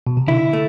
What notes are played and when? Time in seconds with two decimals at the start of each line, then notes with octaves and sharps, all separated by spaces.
0.07 B2
0.17 C3
0.28 D3 E4
0.53 A3